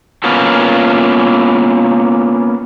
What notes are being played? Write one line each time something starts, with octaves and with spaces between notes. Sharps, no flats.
A#3 B3 C#4 F4 F#4